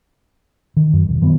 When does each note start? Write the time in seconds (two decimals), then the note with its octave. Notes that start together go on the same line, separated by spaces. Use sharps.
0.77 D#3
0.93 F#2
1.09 E1
1.22 D#3 E3 F#3 B3